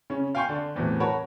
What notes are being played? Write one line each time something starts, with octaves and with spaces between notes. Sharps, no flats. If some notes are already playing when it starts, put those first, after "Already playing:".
C#3 C#4
F5 G5 G#5 C6 C#6 G6
D3 D4
E2 A2 C3 E3 F#3
F#4 A#4 C#5 A5 B5